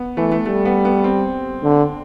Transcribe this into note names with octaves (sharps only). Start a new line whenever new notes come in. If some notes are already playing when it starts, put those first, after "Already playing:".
Already playing: B3
E3 A3
A3
G3 A3
B3
B3
C4
D3